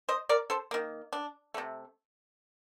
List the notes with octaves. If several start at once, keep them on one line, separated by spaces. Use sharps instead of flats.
C5 D#5
A#4 D5
A4 C5
D#3 A#3
D4
C3 F3 A3